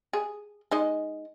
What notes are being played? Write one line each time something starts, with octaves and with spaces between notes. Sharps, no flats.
G#4
G#3 D#4 D#5